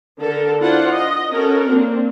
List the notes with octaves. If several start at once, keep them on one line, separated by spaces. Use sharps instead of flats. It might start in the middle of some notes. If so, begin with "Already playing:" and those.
D3 A4 A#4
D4 E4 F4 C5 F#5
D#5
C#4 F#4 A4 A#4
A#3 C4 D4